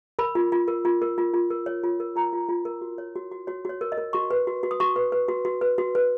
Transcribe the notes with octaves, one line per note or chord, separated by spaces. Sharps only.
A#4 B5
F4
F4
A#4
F4
A#4
F4
F4
A#4
C#5
F4
A#4
F4 A#5
F4
F4
A#4
F#4
C#5
F#4
F#4
F#4 C#5
F#4 C#5
A#4
D#5
A#4
F#4 C#6
B4
F#4
F#4
D#6
F#4 C#6
B4
B4
F#4
F#4
B4
F#4
B4